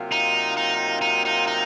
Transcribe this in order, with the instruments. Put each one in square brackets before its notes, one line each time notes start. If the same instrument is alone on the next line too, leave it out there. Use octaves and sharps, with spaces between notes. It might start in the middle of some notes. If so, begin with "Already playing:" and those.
Already playing: [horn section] C3 F#3 A#3 F4
[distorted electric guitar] D#4
D#4
D#4
D#4
D#4